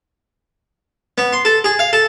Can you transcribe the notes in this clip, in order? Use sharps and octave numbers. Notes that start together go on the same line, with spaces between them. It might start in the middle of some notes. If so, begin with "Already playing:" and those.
B3
C6
A4
G#4
F5
A4